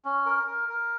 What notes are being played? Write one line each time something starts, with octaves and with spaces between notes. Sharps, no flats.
C#4
A#4
A#4
A#4